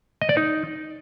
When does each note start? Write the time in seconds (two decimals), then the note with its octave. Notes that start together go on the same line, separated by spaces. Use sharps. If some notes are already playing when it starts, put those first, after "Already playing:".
0.21 D#5
0.29 D5
0.37 D#4